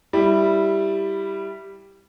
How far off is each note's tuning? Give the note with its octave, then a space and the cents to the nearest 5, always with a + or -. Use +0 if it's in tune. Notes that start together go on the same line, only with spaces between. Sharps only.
G3 +0 E4 +0